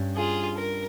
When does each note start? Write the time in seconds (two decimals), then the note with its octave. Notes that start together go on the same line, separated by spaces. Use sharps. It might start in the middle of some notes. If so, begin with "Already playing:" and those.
Already playing: G2 G3 C#4
0.17 F4 G#4
0.58 A#4